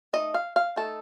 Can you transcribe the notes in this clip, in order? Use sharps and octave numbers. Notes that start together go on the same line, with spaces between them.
A3 D#4 D#5
F5
F5
A3 D#4 A4